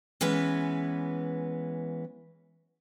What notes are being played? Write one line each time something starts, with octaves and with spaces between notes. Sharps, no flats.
E3 G#3 B3 C#4 B4